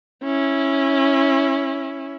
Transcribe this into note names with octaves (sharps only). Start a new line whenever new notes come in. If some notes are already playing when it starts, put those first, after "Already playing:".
C#4 E4